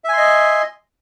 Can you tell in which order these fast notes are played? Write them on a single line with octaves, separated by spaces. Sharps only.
E5 G#5 C6 D#5